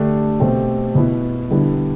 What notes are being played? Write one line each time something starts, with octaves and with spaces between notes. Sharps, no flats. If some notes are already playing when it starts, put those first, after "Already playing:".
Already playing: D3 A3 D4 G4
B2 A3 C4 G4
B2 B3 E4
D3 G3 B3 E4